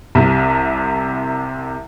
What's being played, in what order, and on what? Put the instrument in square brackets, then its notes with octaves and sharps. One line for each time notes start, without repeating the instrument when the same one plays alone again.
[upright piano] C2 C3